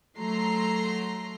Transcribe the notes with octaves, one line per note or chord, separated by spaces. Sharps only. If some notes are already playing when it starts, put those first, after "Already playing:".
F#3 A3 A#5 C6 C7